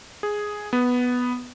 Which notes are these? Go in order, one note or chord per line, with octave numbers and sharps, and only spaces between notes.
G#4
B3